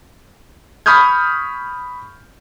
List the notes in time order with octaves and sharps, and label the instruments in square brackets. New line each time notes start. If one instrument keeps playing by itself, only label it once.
[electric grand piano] B5 C#6 D#6 F6 G6 G#6